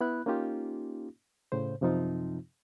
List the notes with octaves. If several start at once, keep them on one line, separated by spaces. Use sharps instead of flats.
B3 E4 B5 F#6
A#3 C#4 D#4 F4 G4
A2 C#3 C5
F#2 C3 F3 C4 D#4 F4